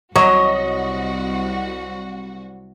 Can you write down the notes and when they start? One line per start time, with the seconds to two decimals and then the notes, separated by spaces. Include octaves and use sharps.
0.16 C2 F#3 F#4 C#5 D#5